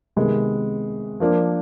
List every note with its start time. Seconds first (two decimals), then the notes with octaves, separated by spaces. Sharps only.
0.16 C3 D#3 G#3 B3
1.20 F3 A#3 D4